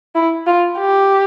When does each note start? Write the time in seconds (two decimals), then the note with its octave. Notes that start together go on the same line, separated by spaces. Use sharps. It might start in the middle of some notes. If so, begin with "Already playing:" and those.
0.15 E4
0.47 F4
0.78 G4